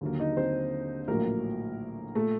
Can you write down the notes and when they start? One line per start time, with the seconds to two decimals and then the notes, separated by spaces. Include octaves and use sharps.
0.01 D#2 D3 F#3 A#3
0.19 D#4 D#5
0.37 C4 C5
1.08 A#1 A2 F#3 A#3 A#4
2.15 A#2 A3 A4